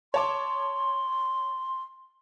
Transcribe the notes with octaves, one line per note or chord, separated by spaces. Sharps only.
C#5 A5 C6 D6